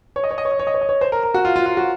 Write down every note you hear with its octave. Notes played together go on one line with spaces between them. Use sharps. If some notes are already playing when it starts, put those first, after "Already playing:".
C#5
D#5
C#5
D#5
C#5
D#5
C#5
D#5
C#5
D#5
C#5
C5
A#4
A#4
F#4
F4
F4
F4
F#4